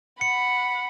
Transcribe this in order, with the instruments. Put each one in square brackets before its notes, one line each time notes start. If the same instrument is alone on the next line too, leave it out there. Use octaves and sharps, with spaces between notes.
[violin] F#5 B5 [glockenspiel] C#7